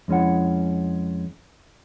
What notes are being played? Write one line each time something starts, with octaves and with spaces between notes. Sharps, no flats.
F2 G#3 C#4 E4 F#5